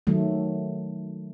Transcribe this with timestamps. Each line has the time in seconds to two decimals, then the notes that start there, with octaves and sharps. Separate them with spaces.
0.07 D#3 F#3 A3